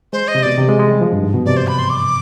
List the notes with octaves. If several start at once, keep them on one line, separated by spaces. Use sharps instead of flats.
G#3 C5
D#5
C3
B2 D5
C3
G#3
G#3
G3
F3
G2
G#2
B2
C3 D5
C5
B5
C6
D6